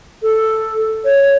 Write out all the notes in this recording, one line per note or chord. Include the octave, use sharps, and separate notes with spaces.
A4
C#5